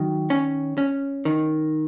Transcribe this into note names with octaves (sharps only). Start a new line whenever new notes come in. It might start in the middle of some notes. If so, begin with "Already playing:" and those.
Already playing: D#3 F#3
C#4
C#4
D#3